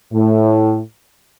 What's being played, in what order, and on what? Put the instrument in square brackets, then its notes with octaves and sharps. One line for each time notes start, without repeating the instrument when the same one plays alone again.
[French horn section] A2